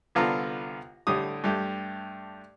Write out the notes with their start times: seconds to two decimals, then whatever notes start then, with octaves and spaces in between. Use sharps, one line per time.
0.15 C2 D3 B3 F4 A4 A#5
1.07 A2 D3 G3 D#6
1.44 G2 A3 G4